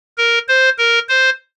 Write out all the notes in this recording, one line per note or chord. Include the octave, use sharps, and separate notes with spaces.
A#4
C5
A#4
C5